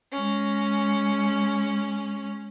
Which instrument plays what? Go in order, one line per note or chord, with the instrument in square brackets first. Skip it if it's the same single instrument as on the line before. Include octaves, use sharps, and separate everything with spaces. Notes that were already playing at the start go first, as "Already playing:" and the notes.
[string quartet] G#3 C#4